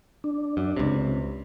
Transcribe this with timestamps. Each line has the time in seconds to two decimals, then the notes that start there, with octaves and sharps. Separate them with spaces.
0.24 D4
0.57 F#2
0.77 C#2 C3